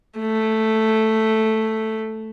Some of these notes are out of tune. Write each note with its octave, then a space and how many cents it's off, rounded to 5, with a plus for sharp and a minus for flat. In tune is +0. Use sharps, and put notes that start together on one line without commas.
A3 +0